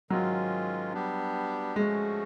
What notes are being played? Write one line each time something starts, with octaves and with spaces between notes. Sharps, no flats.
G#2 D#3 F#3 G#3 C#4 F4
G3 B3 D4 G4
F3 G#3 A3 C#4 F#4